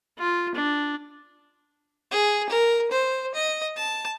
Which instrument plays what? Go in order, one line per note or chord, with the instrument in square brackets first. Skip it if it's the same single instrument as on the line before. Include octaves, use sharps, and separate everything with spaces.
[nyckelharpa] F4
D4
[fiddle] G#4
A#4
C5
D#5
A5